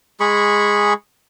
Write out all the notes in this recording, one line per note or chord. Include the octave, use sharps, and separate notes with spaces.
G#3 G#4 B5 C#6